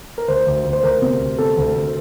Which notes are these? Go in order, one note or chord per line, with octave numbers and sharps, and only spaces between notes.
A#4
D2 C5
D2
D2
C5
D2 A#4
C3
D2
C3 A4
D2
D2